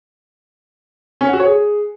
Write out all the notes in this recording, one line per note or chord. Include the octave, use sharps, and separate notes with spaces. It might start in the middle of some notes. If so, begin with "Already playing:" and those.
C#4
F#5
F#4
C#5
G#4